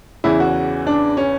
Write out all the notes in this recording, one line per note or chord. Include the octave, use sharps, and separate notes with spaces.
E2 C#3 E3 E4
F#4
D4
C#4